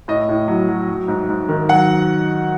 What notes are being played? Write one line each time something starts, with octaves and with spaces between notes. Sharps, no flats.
A2 D#5
A2
F#3
F#3
F#3
G#2
G#2
D#3
F#3 F#5